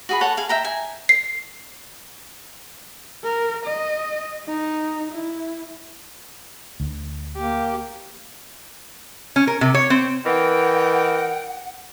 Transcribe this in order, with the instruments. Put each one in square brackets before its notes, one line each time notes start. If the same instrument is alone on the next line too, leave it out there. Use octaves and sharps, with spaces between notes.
[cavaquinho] F#4 G#4 B5
A4 C#5 F#5
G#4 F5
E5 G5 A#5
G#5
[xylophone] C7
[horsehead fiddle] A#4
D#5
D#4
E4
[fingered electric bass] D2
[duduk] A#3 [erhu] G4
[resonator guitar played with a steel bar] C#4
A#4
C3
C#5
C4
[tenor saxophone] E3 [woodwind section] A#4 D#5 G5 [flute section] F#5